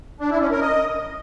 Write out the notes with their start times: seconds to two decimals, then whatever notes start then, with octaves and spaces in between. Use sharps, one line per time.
0.20 D4
0.30 E4
0.41 C#4
0.51 A#4
0.61 D#5